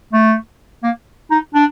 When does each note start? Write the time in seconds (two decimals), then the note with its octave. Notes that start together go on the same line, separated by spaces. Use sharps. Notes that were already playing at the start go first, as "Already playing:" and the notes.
0.13 A3
0.83 A#3
1.31 D#4
1.54 D4